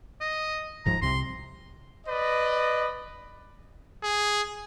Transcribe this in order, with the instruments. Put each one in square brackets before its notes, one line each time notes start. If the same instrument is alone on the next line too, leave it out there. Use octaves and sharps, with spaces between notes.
[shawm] D#5
[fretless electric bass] D1 G#2 F3 [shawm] A#5
[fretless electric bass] C2 C3 [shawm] C6
[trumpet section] B4 D5 D#5
[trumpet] G#4